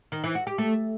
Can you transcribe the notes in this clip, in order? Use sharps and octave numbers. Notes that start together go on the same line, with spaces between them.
D#3
E3
F#4
G4
A3